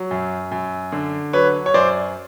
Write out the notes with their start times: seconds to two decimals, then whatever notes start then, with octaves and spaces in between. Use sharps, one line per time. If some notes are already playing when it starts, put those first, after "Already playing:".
Already playing: F#3
0.11 F#2
0.52 F#2
0.92 D3
1.33 F#3 B4 C#5
1.66 C#5
1.74 F#2 C5 D5